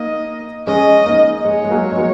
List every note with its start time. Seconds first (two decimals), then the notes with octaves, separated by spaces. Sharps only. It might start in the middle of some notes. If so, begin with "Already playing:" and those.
Already playing: A#3 D#4 D#5
0.67 G#3 C#4 D#5
1.06 A#3 D#4
1.45 G#3 C#5
1.64 G#3
1.71 F#3 A#3
1.92 G#3
1.97 F#3 A#3